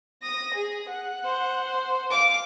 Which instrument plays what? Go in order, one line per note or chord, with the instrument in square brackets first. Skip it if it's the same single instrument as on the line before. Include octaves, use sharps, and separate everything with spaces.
[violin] D#6 A#6
G#4
F#5
[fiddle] C5
F5 D6